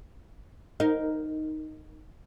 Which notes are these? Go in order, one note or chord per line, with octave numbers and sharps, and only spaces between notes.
D#4 A#4